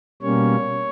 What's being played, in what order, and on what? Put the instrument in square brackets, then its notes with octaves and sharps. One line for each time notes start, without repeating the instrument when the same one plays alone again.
[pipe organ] B2 G3 A#3 C#4 C#5